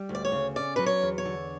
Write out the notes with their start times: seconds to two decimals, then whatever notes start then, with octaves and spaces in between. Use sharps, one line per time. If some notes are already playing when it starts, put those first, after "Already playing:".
Already playing: G3
0.09 D2
0.15 D5
0.25 C#5
0.32 C#3
0.56 C#4 D5
0.76 F#3 B4
0.86 C#5
1.02 E2
1.18 C#5
1.25 D3